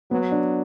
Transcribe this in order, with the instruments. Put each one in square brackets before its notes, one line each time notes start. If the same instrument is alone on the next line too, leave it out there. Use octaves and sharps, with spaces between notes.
[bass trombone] F#3 [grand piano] B3
[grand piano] D4